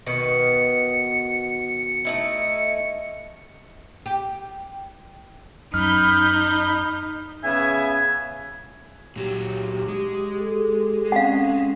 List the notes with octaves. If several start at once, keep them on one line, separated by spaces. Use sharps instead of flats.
B2 D#3 B3 C#7
A3 D#4 E4
G4
F#2 D#4 B5 F6 G6
C#3 B3 E5 G#5
A#2 F#3 G4
G#3
G#4 A4
C4 C#4 F5 F#5